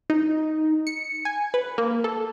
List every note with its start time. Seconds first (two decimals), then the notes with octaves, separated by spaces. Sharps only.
0.10 D#4
0.87 C#7
1.25 G#5
1.54 B4
1.78 A#3
2.04 A4